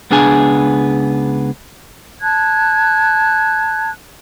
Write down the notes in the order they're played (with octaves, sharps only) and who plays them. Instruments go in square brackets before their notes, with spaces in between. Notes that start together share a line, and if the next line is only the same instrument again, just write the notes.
[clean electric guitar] C#2 B3 D4 G#4 G#5
[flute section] A5 F#6 G#6